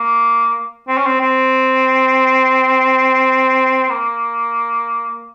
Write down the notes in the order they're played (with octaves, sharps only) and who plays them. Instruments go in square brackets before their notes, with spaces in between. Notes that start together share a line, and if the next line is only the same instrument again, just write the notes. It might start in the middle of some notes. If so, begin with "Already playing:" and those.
Already playing: [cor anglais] A#3
C4
C#4
C4
C4
A#3